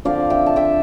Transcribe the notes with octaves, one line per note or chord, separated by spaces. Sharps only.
D3 F3 C4 D5 F5
E5 G5
A5
E5 G5